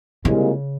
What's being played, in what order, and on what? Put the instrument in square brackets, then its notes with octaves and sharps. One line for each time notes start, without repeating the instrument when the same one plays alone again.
[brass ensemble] C2 A#2 G#3 [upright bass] C#3